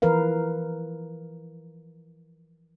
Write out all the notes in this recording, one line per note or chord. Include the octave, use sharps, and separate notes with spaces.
E3 F3 A#4 B4 F5